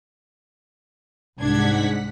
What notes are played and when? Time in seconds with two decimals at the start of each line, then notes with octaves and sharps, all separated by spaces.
1.38 C2 G#2 D4 F#5 G#6 B6